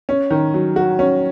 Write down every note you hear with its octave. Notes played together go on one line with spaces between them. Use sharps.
C#4
D#3
F#3
F#4
C#4